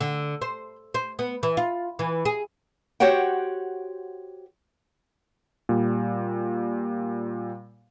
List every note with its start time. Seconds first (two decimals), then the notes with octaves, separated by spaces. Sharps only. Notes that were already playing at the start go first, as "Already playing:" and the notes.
0.01 D3
0.41 C5
0.94 C5
1.19 B3
1.43 E3
1.57 F4
1.99 E3
2.25 G#4
3.00 F#4 G4 C5 C#5 F#5 G5
5.69 A#2 G3